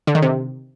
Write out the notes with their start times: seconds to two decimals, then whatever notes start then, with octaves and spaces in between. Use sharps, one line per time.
0.07 D3
0.15 D#3
0.22 C3